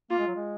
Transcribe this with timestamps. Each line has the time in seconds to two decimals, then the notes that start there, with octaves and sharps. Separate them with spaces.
0.10 A#3 F4
0.18 G#3
0.27 F#3
0.36 G#3